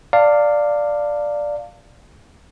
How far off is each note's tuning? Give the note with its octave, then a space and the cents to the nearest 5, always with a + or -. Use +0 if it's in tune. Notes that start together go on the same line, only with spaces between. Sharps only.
D5 +0 F5 +0 A5 +40